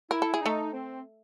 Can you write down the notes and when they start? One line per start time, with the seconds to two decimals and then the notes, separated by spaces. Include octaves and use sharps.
0.10 E4 A#4
0.22 A4
0.34 G#4
0.41 A3 D#4 A4
0.73 C4